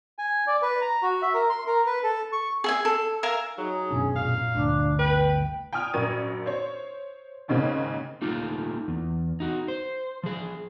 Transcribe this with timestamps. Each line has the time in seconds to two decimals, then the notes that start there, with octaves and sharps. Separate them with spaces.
0.19 G#5
0.47 D5
0.62 B4
0.81 A#5
1.02 F#4
1.22 E5
1.34 A#4
1.50 C6
1.67 A#4
1.86 B4
2.03 A4
2.33 C#6
2.64 G#4 E5 G#5
2.85 A4
3.23 A#4 E5 F5 G#5
3.58 F#3 D#4 G#4
3.91 F#2 B2 C#4 D4
4.16 A#2 F5
4.54 G1 D2 G2 D4
4.99 B4 G5
5.73 G5 G#5 D#6 F6
5.93 A#1 F#2 A#4 C#6 G#6 D#7
6.46 C5 C#5
7.48 D#2 G#2 C#3 A#3 C4 C#4
8.22 A3 A#3 D#4 F4
8.88 E2
9.40 D#4 F#4
9.68 C5
10.23 F3 G#4